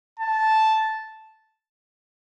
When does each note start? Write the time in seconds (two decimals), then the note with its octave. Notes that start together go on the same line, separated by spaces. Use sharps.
0.20 A5